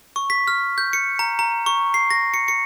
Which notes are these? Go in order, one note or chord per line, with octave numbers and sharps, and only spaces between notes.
C#6
B6
F6
G6
C#7
A#5
A#5
C#6
C7
A#6
C#7
C#7